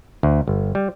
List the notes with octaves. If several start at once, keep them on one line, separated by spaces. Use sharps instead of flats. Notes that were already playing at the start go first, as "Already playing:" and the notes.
D2
G1
G3